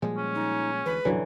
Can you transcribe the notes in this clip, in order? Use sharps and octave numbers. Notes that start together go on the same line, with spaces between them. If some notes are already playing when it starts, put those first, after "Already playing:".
A#2 F3 G3 G#3
C#4
D#4
D2 E3 B4
C2 F#2 A#2 D3 E3 F#3